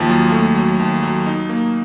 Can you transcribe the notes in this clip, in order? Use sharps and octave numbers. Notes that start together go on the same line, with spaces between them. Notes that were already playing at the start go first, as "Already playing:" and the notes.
Already playing: D#2 F3
F#3
A3
F#3
D#2
F#3
D#4
A#3